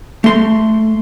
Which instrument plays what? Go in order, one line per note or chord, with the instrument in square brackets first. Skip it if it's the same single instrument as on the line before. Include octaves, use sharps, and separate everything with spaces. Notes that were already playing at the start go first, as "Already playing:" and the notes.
[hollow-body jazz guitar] A3 C6